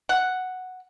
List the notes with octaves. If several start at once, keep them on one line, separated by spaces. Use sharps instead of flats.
F#5